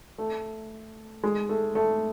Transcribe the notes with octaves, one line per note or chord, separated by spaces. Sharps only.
A3
G#3
A3
A3